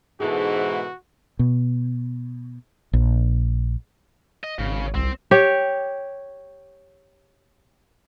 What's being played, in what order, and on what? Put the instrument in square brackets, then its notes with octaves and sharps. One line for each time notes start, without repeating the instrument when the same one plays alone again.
[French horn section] G#2 [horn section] B2 E3 [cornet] F#4 [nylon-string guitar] G#4 A4
[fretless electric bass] B2
A#1
[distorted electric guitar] D#5
[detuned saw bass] G#1 [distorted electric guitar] C#3
[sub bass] C2 [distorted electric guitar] C4
[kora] G4 C#5